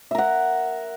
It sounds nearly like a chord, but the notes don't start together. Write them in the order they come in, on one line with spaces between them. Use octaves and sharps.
E5 A#4 F#5